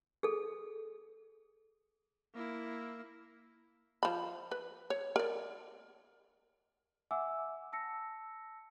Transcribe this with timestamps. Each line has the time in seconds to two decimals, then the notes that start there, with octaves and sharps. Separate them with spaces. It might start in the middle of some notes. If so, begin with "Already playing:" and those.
0.23 G#4 A4
2.34 A#3 E4
4.03 F3 B5
4.51 B4
4.90 C#5
5.16 A#4 D5
7.11 E5 F#5 G#5 D6 E6
7.72 A5 E6 A#6 C#7